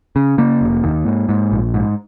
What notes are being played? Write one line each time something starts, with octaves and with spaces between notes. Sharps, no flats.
C#3
C#3 A#3
F1
D#2
G#2
G#2
A#1
G#2